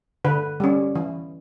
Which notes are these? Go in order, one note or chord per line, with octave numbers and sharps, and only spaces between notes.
D3 B4
G3 C#4
E3